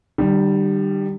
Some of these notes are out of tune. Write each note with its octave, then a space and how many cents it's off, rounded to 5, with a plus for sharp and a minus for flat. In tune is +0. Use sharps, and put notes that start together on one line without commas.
D#3 -45 G3 +0